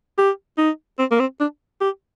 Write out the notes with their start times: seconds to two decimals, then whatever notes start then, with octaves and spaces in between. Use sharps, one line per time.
0.18 G4
0.58 D#4
0.99 C4
1.11 A#3
1.20 C4
1.40 D4
1.81 G4